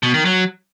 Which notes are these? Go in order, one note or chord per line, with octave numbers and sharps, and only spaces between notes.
B2
D#3
F#3